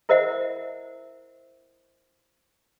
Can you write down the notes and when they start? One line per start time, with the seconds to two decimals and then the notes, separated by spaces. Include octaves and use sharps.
0.09 E4 A#4 C5 D#5 E5 F#5